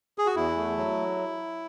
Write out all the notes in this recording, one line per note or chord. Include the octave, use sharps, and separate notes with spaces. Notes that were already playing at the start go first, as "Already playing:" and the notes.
G#4
F#4
E2 E4
A3
F#3